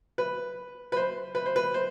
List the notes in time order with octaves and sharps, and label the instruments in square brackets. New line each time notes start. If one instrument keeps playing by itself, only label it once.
[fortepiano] B4
B4
C5
B4
C5
B4
C5